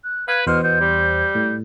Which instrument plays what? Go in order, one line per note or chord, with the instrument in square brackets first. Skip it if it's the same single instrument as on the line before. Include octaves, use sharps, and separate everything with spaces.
[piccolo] F#6
[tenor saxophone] B4 [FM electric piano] F5 F#6 [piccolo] G#6
[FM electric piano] E2 C5 [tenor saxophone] B2 [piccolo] F6
[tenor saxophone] B2 [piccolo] G6
[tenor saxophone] G3
[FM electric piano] A2